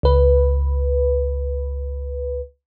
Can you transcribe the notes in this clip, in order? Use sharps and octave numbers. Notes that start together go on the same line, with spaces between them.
C#2 B4